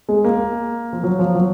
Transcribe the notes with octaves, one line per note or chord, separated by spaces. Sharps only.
G#3
A#3
F3
F#3
F3
F#3